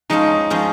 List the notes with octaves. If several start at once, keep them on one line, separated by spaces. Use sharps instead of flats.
F3 G#3 C#4 D#4 F4
F3 G#3 C#4 F4